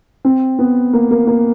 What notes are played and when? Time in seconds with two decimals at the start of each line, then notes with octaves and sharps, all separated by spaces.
0.25 C4
0.59 B3
0.93 A#3
1.11 A#3
1.27 A#3